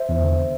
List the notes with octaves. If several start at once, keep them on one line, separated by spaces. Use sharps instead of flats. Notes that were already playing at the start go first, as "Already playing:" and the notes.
Already playing: C5 E5
E2
D3